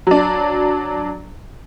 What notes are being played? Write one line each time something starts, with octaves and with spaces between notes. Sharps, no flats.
F#3 D4